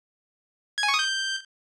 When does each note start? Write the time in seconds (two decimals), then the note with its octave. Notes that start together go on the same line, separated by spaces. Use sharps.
0.78 G#6
0.83 G#5
0.88 C#6
0.94 D#6
0.99 G6